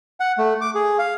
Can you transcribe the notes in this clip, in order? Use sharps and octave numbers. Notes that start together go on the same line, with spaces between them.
F#5
A3
D6
G#4
F5